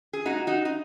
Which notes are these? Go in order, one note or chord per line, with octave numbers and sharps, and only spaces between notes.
G#4
A#2 G#3 D#4 F#4
D#4 F#4
D#4